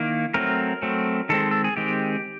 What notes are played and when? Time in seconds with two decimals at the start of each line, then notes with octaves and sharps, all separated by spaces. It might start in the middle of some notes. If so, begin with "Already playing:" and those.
Already playing: D#3 A#3 E4
0.34 F#3 A3 C4 A#4
0.82 F#3 A3 C4
1.29 D#3 G#3 C4 A4
1.51 A4
1.64 G#4
1.77 D#3 G#3 C4 G4